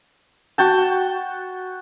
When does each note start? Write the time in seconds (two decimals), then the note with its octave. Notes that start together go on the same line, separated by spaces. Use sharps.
0.58 F#4 G5 A5